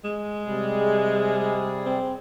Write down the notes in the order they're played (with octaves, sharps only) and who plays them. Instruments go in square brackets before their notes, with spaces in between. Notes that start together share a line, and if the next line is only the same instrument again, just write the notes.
[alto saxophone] G#3
[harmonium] C3 G3 G#4
[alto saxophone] C4